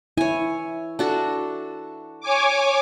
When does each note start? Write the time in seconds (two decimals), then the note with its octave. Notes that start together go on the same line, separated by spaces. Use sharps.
0.17 E4 C#5 G#5
0.99 D4 F#4 A4
2.21 C#5 G#5 D6